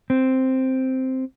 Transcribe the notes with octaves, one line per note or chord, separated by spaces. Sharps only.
C4